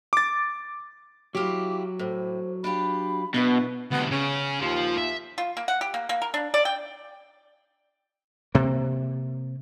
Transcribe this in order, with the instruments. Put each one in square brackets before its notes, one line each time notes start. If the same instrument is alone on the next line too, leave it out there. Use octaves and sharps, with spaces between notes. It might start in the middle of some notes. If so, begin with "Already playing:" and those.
[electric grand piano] D6 A6
[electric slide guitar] F#3 [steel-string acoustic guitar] E4 F4 G4 [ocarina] D6
[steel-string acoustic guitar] A2 [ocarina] C5
[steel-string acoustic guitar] D4 F4 G4 [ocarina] B5
[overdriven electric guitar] B2 [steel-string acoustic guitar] D4 E4 B4
[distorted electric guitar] D2 C3 [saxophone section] B3
[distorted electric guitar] C#3 [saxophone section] C#4
[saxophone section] D#2 F4 [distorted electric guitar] F3
[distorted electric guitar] E5
[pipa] F4
A#3
F#5
G4
A#3
A#3
A#4
D4
D5
G5
[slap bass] C3 A#3